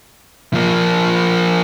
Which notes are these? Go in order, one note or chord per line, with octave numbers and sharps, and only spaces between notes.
F3 A#3